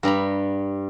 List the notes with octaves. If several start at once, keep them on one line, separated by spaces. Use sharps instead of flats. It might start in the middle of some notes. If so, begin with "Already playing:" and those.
G2 G3 A#5 B5